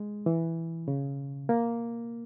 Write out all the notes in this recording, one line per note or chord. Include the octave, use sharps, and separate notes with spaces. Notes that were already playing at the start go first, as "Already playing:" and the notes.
Already playing: G#3
E3
C#3
A#3